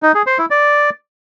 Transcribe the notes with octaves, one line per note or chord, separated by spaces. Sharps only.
D#4
G#4
C5
E4
D5